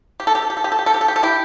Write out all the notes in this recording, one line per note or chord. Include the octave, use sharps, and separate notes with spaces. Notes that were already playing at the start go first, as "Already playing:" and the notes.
G4
A4
G4
A4
G4
A4
G4
A4
G4
A4
G4
A4
G4
A4
E4 G4